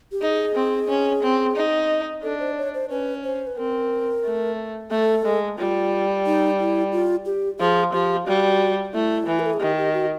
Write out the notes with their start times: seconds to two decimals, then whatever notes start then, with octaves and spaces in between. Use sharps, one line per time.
0.12 G4
0.22 D#4 G#4
0.55 C4
0.89 C#4
1.23 C4
1.56 D#4
2.23 D4 A4
2.39 C5
2.57 C#5
2.74 C5
2.90 C#4 B4
3.24 C5
3.47 B4
3.57 C4 A#4
4.24 A3
4.91 A3 A4
5.25 G#3
5.58 G3 F4
6.26 D#4
6.60 E4
6.92 F4
7.26 G4
7.60 F3 G#4
7.93 F3 G4
8.26 G3 F#4
8.94 A3 E4
9.27 E3
9.39 A#4
9.46 A4
9.54 G#4
9.60 D#3 G4
9.78 G4
9.94 F#4